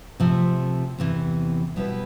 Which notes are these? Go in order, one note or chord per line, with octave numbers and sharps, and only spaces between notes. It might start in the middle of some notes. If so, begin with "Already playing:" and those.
C3 F3 A3
E2 C3 E3
B2 G3 B3 E4 B4